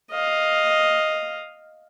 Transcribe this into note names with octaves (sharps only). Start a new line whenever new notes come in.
D#5 F5